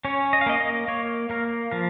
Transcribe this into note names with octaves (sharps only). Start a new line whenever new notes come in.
C#4 C#5
D#5
F5
A#3 D#5
D#5
A#3 C#5
A#3 A#4
F3 A#4